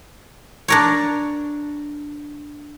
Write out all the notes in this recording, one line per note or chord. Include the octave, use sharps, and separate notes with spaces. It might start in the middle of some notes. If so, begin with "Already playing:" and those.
D4 A#4 C#5